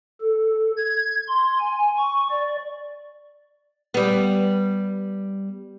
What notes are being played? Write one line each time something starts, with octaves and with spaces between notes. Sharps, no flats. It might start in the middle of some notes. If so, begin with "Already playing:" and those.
A4
G#6
C6
G#5
C#6
D5
G3 B3